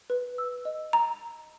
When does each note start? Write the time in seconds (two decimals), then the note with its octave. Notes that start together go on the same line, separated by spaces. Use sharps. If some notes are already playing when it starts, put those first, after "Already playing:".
0.10 B4
0.38 E6
0.65 D#5
0.93 A#5